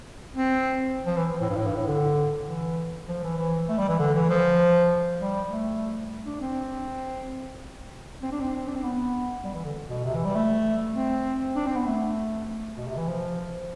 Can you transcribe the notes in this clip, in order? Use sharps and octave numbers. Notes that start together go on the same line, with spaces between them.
C4
F3
E3
A2
G2
A2
G2
A2
D3
E3
F3
E3
E3
A3
G3
E3
D3
E3
F3
G3
A3
D4
C4
C4
D4
C4
D4
C4
B3
G3
E3
D3
B2
C3
E3
G3
A3
C4
D4
C4
B3
A3
B2
C3
E3
F3